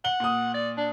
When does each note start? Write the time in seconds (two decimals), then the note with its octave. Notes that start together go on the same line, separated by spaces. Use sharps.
0.05 F#5 G7
0.20 A#2 D#6
0.54 D5
0.77 D4